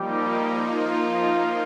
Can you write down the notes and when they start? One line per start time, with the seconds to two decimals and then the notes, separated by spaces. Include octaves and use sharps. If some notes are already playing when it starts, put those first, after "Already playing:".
Already playing: F3 G3 A#3 D#4 G4
0.72 F4